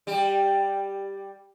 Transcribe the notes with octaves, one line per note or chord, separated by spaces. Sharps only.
G3 G4